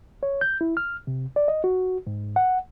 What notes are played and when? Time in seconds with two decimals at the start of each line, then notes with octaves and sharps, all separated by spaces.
0.23 C#5
0.41 G6
0.61 E4
0.77 F6
1.07 C3
1.36 D5
1.48 D#5
1.64 F#4
2.07 G#2
2.36 F#5